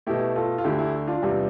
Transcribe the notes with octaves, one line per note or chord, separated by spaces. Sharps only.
B2 A3 E4 G4
F4 A4
F4
D2 D3 A3 E4 G4
E4 G4
D4 F4
E2 C3 G3